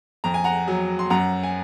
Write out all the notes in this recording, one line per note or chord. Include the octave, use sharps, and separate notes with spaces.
F2 A#5
G#5
F#5 A#5
F#3
C6
F#2 F#5 A#5
G#5